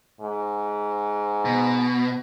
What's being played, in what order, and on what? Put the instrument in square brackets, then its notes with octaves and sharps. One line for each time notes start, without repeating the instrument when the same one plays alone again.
[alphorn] G#2
[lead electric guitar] B2